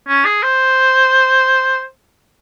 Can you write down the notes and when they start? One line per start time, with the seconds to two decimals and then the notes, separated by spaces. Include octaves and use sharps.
0.08 C#4
0.25 G#4
0.43 C5